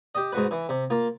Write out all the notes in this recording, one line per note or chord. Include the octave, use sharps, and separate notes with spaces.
G4 D#5
G#2 F#4 B4
E3
C3
A#3 F4